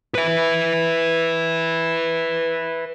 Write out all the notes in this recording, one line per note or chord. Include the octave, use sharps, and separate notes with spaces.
B4 E5